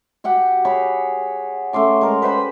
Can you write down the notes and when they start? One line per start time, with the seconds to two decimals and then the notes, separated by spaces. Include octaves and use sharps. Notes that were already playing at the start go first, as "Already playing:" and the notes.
0.24 F#4 G4 F#5 G5
0.65 G#4 C#5 B5
1.73 A3 C#4 C6 D6
2.01 G#3 A#4
2.22 B4 C5 G5 B5